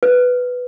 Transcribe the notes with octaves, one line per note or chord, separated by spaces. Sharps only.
B4